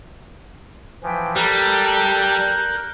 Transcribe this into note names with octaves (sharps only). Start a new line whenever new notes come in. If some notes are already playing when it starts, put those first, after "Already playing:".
E3 F3 B4 G5 G#5
G3 A4 A#4 A5 A#5 F#6 G6